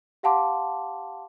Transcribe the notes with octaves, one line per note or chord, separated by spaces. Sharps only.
G4 F5 F#5 A5 C6 D6